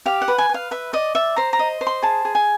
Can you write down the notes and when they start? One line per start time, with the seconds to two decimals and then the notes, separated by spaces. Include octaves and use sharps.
0.06 G4 F5
0.22 F#5
0.28 B4
0.38 G#5
0.49 B4 F5
0.71 B4 E5
0.93 D5 D#5
1.15 D5 E5
1.36 C5 A#5
1.53 A#5
1.59 D#5
1.81 C5
1.87 C6
2.02 G#4 A5
2.25 G#4
2.35 G#5